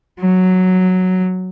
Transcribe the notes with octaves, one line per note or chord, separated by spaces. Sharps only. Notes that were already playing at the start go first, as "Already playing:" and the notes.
F#3